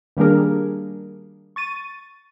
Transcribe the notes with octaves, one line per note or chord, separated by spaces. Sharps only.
D#3 G3 A#3 D4 G#4 A#4
C#6 A6 D#7